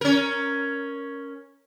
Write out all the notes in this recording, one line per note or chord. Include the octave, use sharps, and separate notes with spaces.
C#4 A#4